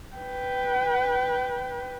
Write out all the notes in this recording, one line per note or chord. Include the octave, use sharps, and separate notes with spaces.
B4 G5